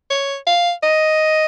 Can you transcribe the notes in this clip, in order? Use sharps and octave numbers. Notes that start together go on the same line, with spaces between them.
C#5
F5
D#5